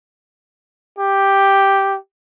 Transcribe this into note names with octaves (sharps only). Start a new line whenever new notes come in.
G4